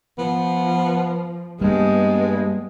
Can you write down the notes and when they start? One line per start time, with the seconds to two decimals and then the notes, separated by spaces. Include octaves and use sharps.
0.18 F3 B3
1.61 G2 G3 G#3 A#3 B3